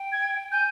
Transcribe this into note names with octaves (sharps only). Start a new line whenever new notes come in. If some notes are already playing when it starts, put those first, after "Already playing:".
Already playing: G5
G#6
G#5 G6